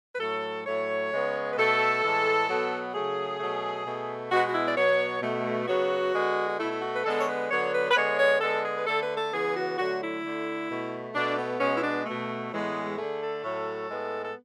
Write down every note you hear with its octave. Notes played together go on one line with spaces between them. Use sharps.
B4
A2 F#3 A3 A4
A2 F#3 A3 C#5
C#3 G#3 B3
B4
B2 A3 A4
A2 E3 G#3
B2 F#3 B3
C#3 F#3 A3 G#4
B2 F#3 A3
B2 A3
B2 G#3 B3 F#4
F#4
E4
D5
B2 F#3 B3 C#5
B2 A3
C#3 F#3 B3 F#4
D3 G#3 B3
F#4
B2 A3 E4
E4
F#4
B4
D3 G#3 B3 A4
C#5
B4
D3 F#3 B3 C#5
B4
B4
D3 G#3 B3 C#5
C#5
D3 G#3 B3 A4
G#4
B4
D3 A3 A4
B4
A4
C#3 E3 B3 G#4
F#4
D3 F#3 A3 F#4
E4
D3 A3
B2 A3
B2 A3 D4
B3
B2 G#3 B3 C#4
E4
D4
B2 A3
A2 E3 G#3 B3
D3 A3 G#4
A4
A2 F#3 A3
A2 G#3 B3
A4